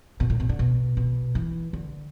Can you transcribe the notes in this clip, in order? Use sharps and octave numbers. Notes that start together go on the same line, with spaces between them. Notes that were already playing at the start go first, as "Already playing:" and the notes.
B2
A2
B2
D3
B2
B2
E3
D3